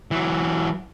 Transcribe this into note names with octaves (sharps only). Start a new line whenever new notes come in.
E3 F#3